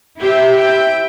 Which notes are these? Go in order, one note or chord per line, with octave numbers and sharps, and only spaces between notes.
E4 G4 C5 E5 G5
G5